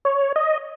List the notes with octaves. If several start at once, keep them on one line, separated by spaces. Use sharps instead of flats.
C#5
D#5